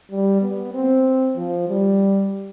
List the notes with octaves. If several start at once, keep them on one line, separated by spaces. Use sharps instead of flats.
G3
B3
C4
F3
G3